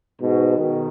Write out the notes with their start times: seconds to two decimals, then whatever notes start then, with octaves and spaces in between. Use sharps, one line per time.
0.21 G#2 B2
0.58 B2 D#3